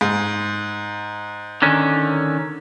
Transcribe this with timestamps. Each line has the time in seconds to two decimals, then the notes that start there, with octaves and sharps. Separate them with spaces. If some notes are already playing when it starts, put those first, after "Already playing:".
0.01 G#2
1.62 D3 D#3 C#4